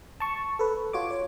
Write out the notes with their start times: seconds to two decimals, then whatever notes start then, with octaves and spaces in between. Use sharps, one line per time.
0.20 A5 C#6
0.59 A4 B4
0.93 F4 F#4 C#5 D6
1.11 C#5